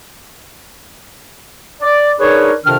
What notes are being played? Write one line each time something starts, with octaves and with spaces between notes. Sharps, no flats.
D5
D4 D#4 G#4 A#4 B4 C#5
F2 C3 D#3 D4 F6